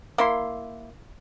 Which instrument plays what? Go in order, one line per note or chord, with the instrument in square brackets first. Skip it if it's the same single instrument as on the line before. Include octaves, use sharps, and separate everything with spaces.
[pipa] A#3 E4 B5 C6